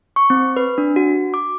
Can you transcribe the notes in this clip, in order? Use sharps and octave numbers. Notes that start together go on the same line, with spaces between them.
C#6
C4
B4
D4
F#4
D6